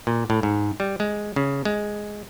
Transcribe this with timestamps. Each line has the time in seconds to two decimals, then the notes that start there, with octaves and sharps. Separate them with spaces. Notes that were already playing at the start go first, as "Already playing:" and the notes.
0.07 A#2
0.30 A2
0.43 G#2
0.80 G3
1.00 G#3
1.36 C#3
1.65 G#3